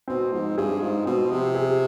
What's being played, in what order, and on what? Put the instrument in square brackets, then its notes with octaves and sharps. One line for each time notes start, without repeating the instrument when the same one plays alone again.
[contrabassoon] B2 [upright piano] C4
[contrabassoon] G#2 [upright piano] F3
[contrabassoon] G2 [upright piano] G#4
[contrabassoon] G#2 [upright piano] F4
[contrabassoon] B2 [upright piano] C4
[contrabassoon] C3 [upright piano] F3
[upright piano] G#4